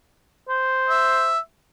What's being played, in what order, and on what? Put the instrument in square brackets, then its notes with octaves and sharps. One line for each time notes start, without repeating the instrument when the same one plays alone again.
[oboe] C5
[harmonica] E5